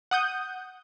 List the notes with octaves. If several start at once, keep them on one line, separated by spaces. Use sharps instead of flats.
F#5 D#6 G6